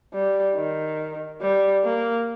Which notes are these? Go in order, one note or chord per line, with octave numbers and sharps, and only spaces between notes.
G3
D#3
G3
A#3